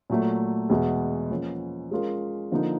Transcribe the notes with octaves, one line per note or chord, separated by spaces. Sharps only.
A#2 F#3 A3
E2 B2 G#3
F3 A#3 C#4
G#3 C#4 F4 A#4
D3 F3 A#3 D#4